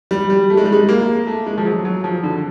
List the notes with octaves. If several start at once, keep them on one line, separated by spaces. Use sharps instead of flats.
G3
G3
A3
G#3
G3
G#3
A#3
A3
G#3
F3
F#3
F#3
F3
D3